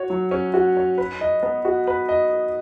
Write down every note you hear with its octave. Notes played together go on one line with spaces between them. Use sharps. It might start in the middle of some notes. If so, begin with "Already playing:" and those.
Already playing: F#4 C#5
F#3
C#4
F#4
C#5
B4
D#5
B3
F#4
B4
D#5